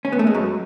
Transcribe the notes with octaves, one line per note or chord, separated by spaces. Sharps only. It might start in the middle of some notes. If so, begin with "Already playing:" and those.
C#4
B3
A3
G#3
F#2 F#3